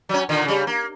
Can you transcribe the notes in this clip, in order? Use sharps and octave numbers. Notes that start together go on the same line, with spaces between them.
F#3 C#4
A#2 D3 D#3
C#3 G3
A#3